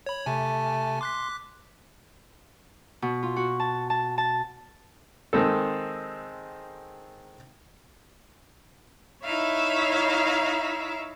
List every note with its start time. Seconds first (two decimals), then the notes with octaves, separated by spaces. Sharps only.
0.06 C#5 B5
0.26 C3 A3 G#5 A5
1.01 C6 D6 F#6 B6
3.02 B2
3.23 F4
3.36 F#4
3.60 A5
3.90 A5
4.18 A5
5.33 D#3 G#3 C4 A4
9.25 D#4 E4 C#5 E5 F5